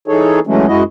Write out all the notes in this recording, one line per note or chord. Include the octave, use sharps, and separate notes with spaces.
E3 D#4 G#4 A4 C#5
E3 F#3 G#3 A3 C#4
F#2 G#3 E4 F#4 D#5